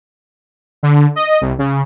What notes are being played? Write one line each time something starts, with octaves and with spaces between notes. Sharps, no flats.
D3
D#5
C2
C#3